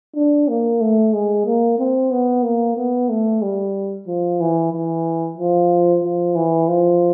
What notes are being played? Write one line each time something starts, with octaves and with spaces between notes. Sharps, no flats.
D4
A#3
A3
G#3
A#3
C4
B3
A#3
B3
A3
G3
F3
E3
E3
F3
F3
E3
F3